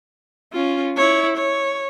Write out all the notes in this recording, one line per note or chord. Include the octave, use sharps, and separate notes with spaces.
C#4 F4
E4 C#5
C#5